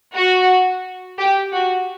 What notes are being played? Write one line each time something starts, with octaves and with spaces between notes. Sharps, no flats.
F#4
G4
F#4